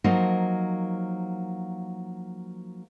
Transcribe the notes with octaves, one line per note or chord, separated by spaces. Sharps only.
F3 F#3 A#3 D#4 A#4 C5